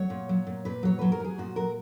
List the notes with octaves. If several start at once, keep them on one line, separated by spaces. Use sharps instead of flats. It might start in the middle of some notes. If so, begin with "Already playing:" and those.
Already playing: F#3 C#5
A#2
F#3
A#2
A#2 B4
F#3 C#5
F#3 B4
A#4
F#3 G#4
A#2 F#4
F#3 A#4